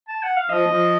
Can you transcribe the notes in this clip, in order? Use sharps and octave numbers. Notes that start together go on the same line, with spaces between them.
A5
F#5
F5
F3 D#5
F3